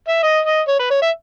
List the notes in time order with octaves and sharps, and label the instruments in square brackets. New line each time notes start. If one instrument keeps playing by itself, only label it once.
[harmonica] E5
D#5
D#5
C#5
B4
C#5
E5